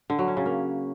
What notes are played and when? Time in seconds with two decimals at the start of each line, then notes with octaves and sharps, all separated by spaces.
0.10 D3
0.19 F#3
0.28 C#4
0.37 C#3
0.46 A#3